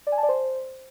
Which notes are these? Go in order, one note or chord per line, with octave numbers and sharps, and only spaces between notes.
D5
G#5
A5
D5
C5